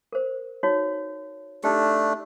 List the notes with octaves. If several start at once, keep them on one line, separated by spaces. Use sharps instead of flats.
A#4 C5
D#4 F#4 C#5
A3 D4 D#4 G4